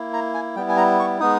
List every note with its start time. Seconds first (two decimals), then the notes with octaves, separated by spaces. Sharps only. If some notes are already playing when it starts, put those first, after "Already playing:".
Already playing: A#3 E4
0.13 A#5
0.34 G#5
0.55 G3 B3 E4 G5
0.69 G#5
0.77 A#5
0.99 C#6
1.20 G#3 B3 D#4 D#6